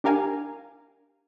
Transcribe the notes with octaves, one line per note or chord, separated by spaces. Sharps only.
D4 G4 A#4 F5 G#5